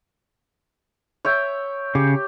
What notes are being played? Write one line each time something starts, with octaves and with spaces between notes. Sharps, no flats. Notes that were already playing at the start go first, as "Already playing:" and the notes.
C#5 E5 G5
C#3 G4